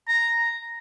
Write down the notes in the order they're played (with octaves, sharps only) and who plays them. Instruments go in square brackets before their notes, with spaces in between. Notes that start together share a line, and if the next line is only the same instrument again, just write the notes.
[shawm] A#5